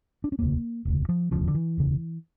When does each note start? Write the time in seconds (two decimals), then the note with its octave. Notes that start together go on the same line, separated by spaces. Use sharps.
0.24 D4
0.32 C#4
0.39 E1 D2 C#3 A#3
0.85 E1 D2 C#3
1.09 F3
1.31 E1 D2 C#3 F3
1.48 D3
1.55 E3
1.77 E1 D2 C#3